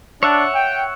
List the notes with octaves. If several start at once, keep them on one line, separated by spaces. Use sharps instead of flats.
D4 C#5 E5 F#5
G5